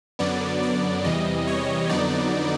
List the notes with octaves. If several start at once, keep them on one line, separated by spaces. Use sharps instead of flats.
F#2 D3 F#3 B3 D5
D5
E2 C3 E3 G3 D#5
C#5
F2 D3 F#3 B3 D#4 D5